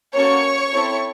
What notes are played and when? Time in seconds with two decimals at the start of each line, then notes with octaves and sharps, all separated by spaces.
0.14 A#3 C#4 F#4 A4 C#5 C#6
0.72 C4 E4 A4